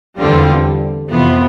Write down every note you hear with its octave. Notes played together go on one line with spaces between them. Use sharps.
E2 D3 G3 C4 F4
F2 C3 E3 B3 F4